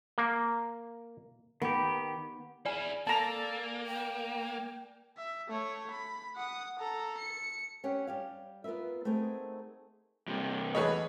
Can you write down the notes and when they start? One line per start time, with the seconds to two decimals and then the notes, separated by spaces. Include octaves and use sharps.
0.18 A#3
1.62 D#3 B3 G4
2.65 E4 G#4 D5 G#5
3.07 A#3 A4 A5 A#5
3.86 G5
5.17 E5
5.48 A3 C#5
5.91 B5
6.36 F#5 D#6
6.79 A4 A#5
7.18 C#7
7.84 C#4 G4 C#5 F#5
8.07 G3 G4 F5
8.64 B3 F4 A#4 B4 E5
9.05 A3 B3 C4 D#4 G#4 A#4
10.28 G2 C3
10.75 E2 A3 G#4 B4 C#5 D#5